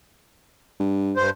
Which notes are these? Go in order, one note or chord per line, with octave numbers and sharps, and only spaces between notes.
G2
G2 C5